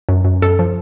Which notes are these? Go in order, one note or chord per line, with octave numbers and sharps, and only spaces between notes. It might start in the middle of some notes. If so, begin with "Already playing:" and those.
F#2
F#2
F#2 A4
F3